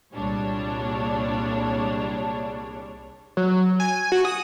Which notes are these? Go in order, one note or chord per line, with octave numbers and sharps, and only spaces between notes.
C2 A#2 G3 G#3 D4 C#5
F#3
G#5
F#4
D#6